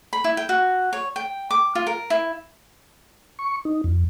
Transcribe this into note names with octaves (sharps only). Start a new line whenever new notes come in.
B5
E4
G5
F#4
C#5
G5
D6
F4
A#4
E4
C#6
D#4
F2